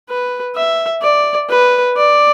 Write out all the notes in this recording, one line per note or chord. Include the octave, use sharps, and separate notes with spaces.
B4
E5
D5
B4
D5